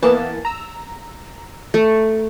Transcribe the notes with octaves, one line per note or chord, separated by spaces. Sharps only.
E3 A#3 B3 A5
A#5 E6
A3